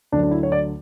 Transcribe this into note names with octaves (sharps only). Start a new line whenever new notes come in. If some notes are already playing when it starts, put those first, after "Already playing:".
D2 D3 F#3 D4
D4
E4
C#5
D5